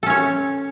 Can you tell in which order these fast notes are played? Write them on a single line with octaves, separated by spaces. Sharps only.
A4 C#4 C#5